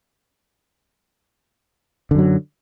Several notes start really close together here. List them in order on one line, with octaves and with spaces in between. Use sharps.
D3 F#2 F#3